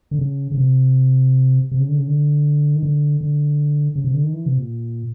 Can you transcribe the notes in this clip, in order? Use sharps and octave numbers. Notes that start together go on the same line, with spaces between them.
D3
C#3
C#3
C3
C3
C#3
D3
C#3
D3
D#3
D3
D3
C#3
C3
D3
D#3
E3
C3
A#2